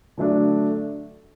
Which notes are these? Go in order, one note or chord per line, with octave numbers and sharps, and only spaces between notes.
D3 F#3 A3 D4